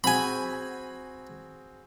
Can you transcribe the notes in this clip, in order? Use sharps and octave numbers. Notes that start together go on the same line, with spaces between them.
C4 F#4 G#4 G#5 B5